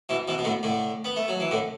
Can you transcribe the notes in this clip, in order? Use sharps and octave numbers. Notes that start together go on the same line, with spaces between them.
B2 E3
B2 E3
B2
A2 D3
A2 D3
B3
A3
F#3
E3
A2 D3